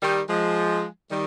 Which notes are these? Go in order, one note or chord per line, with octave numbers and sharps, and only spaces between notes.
D#3 G3
F3 G#3
D#3 G3